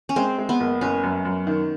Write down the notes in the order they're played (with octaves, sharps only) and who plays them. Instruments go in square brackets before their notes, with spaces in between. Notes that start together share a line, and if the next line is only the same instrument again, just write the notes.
[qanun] C#4
[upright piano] G#3 [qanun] C4
[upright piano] G#3
[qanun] B3
[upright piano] F#1
[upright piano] F#1 [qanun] C#4
[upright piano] F#2
F#2
D#3